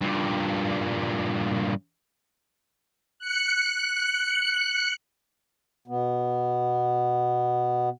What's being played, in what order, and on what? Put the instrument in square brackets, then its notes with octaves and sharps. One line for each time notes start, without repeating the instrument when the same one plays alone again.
[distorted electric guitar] G2 A#2
[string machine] F#6 C#7
[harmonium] B2 B3